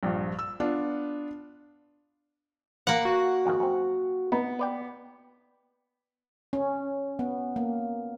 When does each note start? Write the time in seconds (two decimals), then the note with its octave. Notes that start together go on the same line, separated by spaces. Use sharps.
0.03 A#1 G2 F3
0.39 E6
0.60 B3 D4 F4
2.87 A#3 B4 F#5
3.05 F#4
3.46 F2 G#2 D#3
3.60 F#2 C4
4.32 B3 D#4
4.59 B4 D5 G5
6.53 C#4
7.19 B3
7.56 A#3